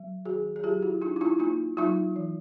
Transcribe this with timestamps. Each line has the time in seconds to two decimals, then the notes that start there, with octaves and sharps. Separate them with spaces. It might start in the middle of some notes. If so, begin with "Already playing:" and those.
Already playing: F#3
0.25 D#3 F#4 G#4
0.56 G#4
0.63 F#3 F4 G4
0.82 E4 F#4
1.01 D4 D#4 F4
1.16 E4
1.21 D#4 F4
1.39 A#3 D#4 F4
1.77 F#3 D#4 F4
2.16 E3